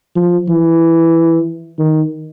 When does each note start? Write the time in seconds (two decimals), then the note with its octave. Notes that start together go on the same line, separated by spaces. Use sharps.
0.16 F3
0.49 E3
1.79 D#3